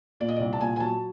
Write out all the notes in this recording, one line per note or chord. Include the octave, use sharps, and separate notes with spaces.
A#2 D5
D#5
C2 D5
A5
A#2 G#5
G#5
F#3 A5